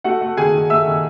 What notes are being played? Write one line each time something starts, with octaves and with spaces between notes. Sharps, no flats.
A3 F#4 F#5
A3
D#3 G#4 G#5
D#3
A3 E5 E6
D#3